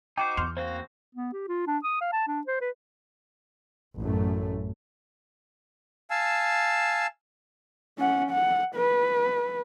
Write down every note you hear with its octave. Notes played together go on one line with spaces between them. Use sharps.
D#4 F#4 C5 G5 D6
E2 C6 F6 G6
A#3 C4 F#4 C5 F5
B3
G4
F4
D4
D#6
F5
A5
D4
C5
B4
A1 F#2 A3
F5 G#5 A5 E6
C#4 F#5
F#5
B4